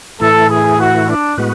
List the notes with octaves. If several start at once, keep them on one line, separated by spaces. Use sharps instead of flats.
A2 E3 A3 E4 A4
G#4
F#4
D4
A2 G#3 B3 F#4 B4